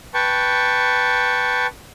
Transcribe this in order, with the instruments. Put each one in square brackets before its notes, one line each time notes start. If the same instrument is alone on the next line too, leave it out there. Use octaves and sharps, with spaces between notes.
[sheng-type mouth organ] B4 G5 A5 C#6